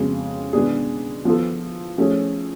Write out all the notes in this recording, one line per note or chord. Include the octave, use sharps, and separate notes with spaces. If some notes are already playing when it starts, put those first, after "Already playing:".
Already playing: F2 C#3 G#3 B3 F#4
B2 G#3 B3 D4 G#4
F3 B3 F4 A4
F3 A3 C#4 G#4